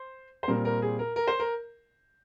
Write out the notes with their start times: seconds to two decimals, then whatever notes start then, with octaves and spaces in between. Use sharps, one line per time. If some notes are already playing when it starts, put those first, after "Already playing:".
Already playing: C5
0.43 C5
0.48 A#2 G3 C4 A#4
0.65 A#4
0.82 G#4
0.99 A#4
1.16 A#4
1.27 C5
1.40 A#4